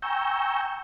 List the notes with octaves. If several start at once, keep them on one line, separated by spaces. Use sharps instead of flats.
G5 G#5 A#5 C#6 E6 G6